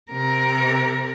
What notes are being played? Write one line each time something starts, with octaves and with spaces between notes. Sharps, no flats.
C3 A#4